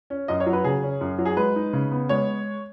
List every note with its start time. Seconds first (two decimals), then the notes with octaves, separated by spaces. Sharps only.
0.10 C#4
0.28 F#2 D#5
0.40 C#5
0.47 F#3
0.53 B4
0.64 C#3 G#4
0.83 C#4
1.01 F#2
1.19 F#3
1.26 G#4
1.37 G#3 B4
1.56 D#4
1.73 C#3
1.92 B3
2.09 G#3 C#5